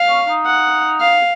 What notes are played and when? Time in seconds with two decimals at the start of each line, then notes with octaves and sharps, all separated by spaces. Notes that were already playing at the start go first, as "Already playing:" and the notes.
Already playing: F5
0.09 C#4
0.27 D#4
0.45 F#5
1.00 F5